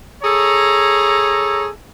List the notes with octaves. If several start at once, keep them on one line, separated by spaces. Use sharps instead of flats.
G#4 A4 C#5 A#5